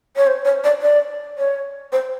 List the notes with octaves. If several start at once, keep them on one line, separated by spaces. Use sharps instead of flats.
C#5
C5
C#5
D5
D5
C#5
C5